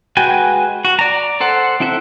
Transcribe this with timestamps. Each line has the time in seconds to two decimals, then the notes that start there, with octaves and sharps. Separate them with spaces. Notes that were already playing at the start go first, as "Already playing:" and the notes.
0.17 G#3 F#4 B4 G5 G#5
0.85 F#4
0.99 D5 A#5
1.40 A4 C5 F#5
1.80 C4 E4 A4 E5 F#5